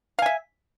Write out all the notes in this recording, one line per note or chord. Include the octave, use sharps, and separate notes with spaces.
E5 F5 G#5